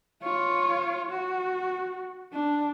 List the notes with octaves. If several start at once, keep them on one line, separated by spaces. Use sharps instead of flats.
F4 C#5
F#4
D4